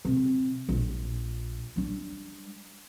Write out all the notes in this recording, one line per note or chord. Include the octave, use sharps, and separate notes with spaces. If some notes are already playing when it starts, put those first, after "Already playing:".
C3
A#1
G3 D4